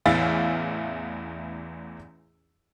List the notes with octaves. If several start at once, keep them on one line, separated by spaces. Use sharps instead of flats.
A1 E2 E3 E5 F5 A6